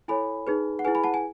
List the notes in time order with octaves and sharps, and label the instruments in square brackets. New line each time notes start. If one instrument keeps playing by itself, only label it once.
[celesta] E4 A4 C#5 G#5 B5
D#4 G#4 B4
F#5
E4 G#4 B4 G#5
G#5 B5
F#5 A5
G#5